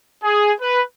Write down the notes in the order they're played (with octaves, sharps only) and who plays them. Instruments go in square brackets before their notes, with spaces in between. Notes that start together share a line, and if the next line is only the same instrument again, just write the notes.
[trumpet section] G#4
B4